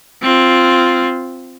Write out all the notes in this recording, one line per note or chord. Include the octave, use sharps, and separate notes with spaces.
C4 F4